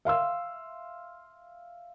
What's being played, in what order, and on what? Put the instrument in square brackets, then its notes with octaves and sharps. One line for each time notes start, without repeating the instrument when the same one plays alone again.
[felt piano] E5 F5 C6 E6